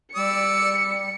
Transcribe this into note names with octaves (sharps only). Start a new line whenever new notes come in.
G3 D5 E6 C#7